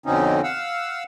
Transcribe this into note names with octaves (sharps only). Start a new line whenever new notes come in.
F2 B2 D3 C4 C#4 D#4
F5 F#5 E6